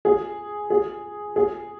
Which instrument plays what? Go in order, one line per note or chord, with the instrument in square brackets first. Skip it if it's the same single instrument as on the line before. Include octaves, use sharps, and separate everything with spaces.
[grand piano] G#4
G#4
G#4